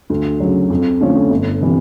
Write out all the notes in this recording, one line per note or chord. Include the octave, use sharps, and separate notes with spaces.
D2
C#3 F#3
F2
D3 F3 A3 C#4
G1
C3 E3